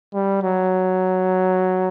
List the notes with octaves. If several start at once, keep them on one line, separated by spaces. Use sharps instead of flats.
G3
F#3